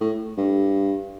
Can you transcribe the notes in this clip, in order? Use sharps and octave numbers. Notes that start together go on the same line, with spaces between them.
A2
G2